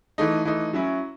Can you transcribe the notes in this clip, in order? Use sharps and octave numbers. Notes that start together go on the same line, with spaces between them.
E3 A3 D#4
E3 A3 D#4
F#3 C#4 E4